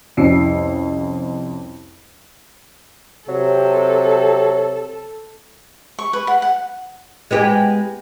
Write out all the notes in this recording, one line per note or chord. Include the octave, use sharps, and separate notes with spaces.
C2 F2 C#4 E6 C7 C#7
C3 F#3 A4
C#6
B4
F#5
F#5
G#3 B3 G4